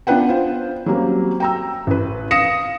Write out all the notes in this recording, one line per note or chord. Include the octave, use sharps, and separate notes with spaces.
B3 D4 F4 B4 F#5 G5
F4 C5
F#3 G3 A#3 C4 C#4
G5 A#5 E6
A1 B4
F5 D#6 A#6 C#7 E7